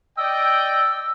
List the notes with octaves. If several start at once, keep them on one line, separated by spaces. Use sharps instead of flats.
D5 D#5 G5 E6